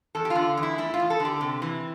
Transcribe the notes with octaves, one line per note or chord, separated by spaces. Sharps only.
E2 A4
G4
F4
D3
E2
E4
A3 E4
F4
E2
A4
D3
G4
C3
E3